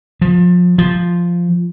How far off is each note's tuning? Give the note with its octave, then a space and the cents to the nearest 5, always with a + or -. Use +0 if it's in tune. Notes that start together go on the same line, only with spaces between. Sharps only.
F3 +30
F3 -5